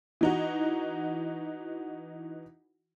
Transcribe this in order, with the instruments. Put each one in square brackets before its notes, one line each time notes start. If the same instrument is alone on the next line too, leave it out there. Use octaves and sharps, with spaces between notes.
[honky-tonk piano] E3 D#4 F#4